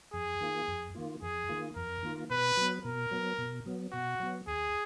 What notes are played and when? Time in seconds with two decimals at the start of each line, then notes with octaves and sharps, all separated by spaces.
0.14 F2 G#4
0.41 D#3 A#3 F4
0.68 F2
0.95 D#3 A#3 F4
1.22 F2 G#4
1.49 D#3 A#3 F4
1.75 F2 A#4
2.03 D#3 A#3 F4
2.30 B2 B4
2.57 F#3 B3
2.84 B2 A#4
3.11 F#3 B3
3.38 B2
3.66 F#3 B3
3.92 B2 F#4
4.20 F#3 B3
4.47 D#2 G#4